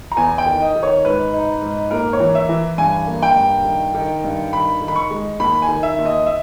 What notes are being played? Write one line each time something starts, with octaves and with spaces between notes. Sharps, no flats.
A#5
E2 G#5
G5
D#3
D#5
D#3
C#5
G#2 B4
D#4
G#2
A#3 A#4
C#5
E3
E5
E3
G2 G#5
A#3
G5
G2
D#3
D#3
G2
D#3 B5
D#3
B5
C#6
G#3
D#2 B5
G#5
D#3
E5
D#2
D#5
E5